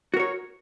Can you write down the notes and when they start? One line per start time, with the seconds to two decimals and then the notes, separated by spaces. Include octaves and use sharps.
0.14 F#4
0.17 A#4
0.20 C#5